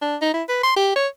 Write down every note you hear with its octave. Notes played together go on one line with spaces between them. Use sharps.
D4
D#4
E4
B4
C6
G4
C#5